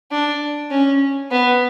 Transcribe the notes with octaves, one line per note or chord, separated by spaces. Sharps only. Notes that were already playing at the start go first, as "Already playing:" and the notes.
D4
C#4
B3